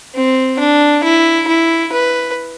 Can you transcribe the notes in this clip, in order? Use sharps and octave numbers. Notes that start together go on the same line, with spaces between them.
C4
D4
E4
E4
B4